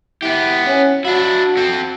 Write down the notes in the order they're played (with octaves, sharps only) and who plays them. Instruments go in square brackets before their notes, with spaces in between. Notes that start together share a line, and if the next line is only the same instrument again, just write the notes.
[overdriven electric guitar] B3 G4 [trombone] E4
[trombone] C#4
[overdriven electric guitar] D4 E4 [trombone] F#4
[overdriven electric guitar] C4 A4